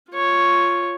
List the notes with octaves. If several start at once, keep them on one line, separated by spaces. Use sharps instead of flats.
F4 C#5